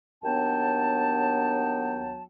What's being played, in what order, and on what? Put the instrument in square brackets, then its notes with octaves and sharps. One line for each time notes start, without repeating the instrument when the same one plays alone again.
[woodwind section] D#2 F#3 B3 D4 G5 A5